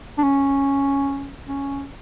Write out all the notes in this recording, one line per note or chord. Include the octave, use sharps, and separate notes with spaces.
D4
C#4
C#4